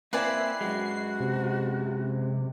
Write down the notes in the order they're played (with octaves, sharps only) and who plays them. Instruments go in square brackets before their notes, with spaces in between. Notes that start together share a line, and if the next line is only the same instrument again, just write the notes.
[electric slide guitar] A#3 C4 E4 [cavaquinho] B4 D5 G#5 [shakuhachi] E5 [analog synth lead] C7
[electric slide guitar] F#2 G#3 [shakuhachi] F#4
[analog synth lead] C3